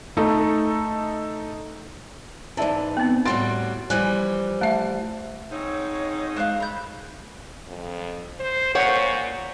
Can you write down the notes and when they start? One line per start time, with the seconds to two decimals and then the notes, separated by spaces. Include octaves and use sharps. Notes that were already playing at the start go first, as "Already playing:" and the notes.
0.17 A3 D#4 A4
2.57 G#2 E3 D5 E5 A5
2.97 B3 C4
3.25 A2 G3 F#4 C6 A6 D7
3.90 E3 F3 G3 G#5 F#6
4.61 A3 E5 A5
5.51 G#2 C4 D#4 C#5
6.37 G#3 C5 C#5 F5 F#6
6.60 A#5 B5 G6
7.68 F2
8.40 C5
8.75 A#2 C5 C#5 F#5